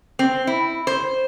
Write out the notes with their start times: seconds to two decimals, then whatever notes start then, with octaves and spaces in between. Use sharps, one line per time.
0.19 C4
0.47 E4
0.87 C5